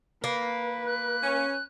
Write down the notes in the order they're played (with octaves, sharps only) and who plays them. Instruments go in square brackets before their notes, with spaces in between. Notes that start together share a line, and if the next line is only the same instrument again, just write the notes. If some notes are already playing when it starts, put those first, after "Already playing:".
[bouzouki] A#3 [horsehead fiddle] B4
[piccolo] F#6
[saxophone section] C#4